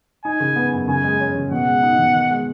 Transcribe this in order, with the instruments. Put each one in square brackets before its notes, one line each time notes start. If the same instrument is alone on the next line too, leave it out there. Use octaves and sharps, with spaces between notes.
[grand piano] D#4 [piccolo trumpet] G#5
[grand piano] C#3
B3
F#2
[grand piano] C#3 [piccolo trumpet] G#5
[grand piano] G#3
C#4
C#3
[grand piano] B2 [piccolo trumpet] F#5
[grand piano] G#3
D#4
B2
D#3
G#3